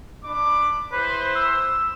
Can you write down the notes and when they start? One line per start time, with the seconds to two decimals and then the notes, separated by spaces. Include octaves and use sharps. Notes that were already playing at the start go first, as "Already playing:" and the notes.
0.24 D4 B5 D6
0.92 E4 G#4 B4 C5
1.35 E6